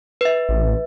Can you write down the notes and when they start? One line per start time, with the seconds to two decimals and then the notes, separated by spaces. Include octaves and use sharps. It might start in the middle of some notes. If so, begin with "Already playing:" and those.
0.21 B4 E5
0.49 A1